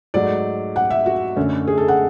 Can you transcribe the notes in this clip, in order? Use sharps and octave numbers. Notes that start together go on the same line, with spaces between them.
G#2 F#3 A3 D5
F#5
E5
F#4
F#2 D3 A3 C#4
G#4
A4
F#5